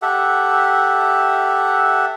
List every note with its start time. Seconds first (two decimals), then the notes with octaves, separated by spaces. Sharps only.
0.02 G4 A4 E5 F#5